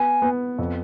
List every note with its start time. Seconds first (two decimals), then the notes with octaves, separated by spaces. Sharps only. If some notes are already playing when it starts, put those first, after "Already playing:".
Already playing: B3 G#5
0.22 B3
0.58 F2